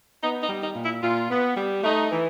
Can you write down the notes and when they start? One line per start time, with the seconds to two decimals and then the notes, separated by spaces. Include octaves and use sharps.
0.21 B3 D#4
0.42 D#4
0.49 G3
0.62 D#4
0.76 A#2
0.82 E4
1.03 A#2 F4
1.30 B3
1.56 G3
1.84 A3 D#4
2.11 E3